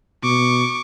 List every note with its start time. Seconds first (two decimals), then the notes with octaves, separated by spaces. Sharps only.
0.23 B2 C#6 D6